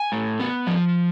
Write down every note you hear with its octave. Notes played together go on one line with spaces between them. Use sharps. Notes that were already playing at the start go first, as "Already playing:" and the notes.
Already playing: G#5
A2
B3
F3